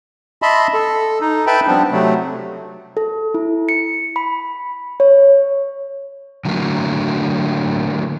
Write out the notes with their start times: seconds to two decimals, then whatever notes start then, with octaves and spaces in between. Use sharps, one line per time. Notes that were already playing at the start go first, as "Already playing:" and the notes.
0.42 D#5 E5 A5 B5 C6
0.74 A4
1.21 D#4
1.47 B4 E5 G5 A5 B5
1.67 F3 G3 B3 C4 D4
1.91 C3 F#3 A3
2.97 A4
3.34 E4
3.69 C#7
4.16 B5
5.00 C#5
6.45 D3 F#3 A3 A#3